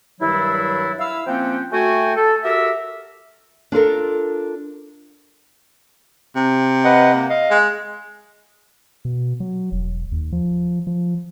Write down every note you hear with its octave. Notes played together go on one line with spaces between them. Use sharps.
G2 D#3 F#3 G3 D4 E4
E4 F5 E6
F3 A#3 C4 C#4 F#5 G5
A3 F#4 G5 G#5
A4
F#4 G4 A4 A#4 E5
D4 F4 A4 A#4
C3
B4 D#5 F#5
A#3
D#5 F5
G#3
B2
F#3
E1
D#2
F3
F3